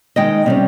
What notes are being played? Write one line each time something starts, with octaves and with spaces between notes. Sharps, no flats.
D#3 G#3 D#4 D#5 G5
C3 G3 C#4